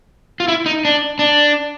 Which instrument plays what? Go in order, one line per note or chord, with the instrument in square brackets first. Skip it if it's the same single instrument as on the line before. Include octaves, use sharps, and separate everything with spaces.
[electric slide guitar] F4
E4
D#4
D4
D4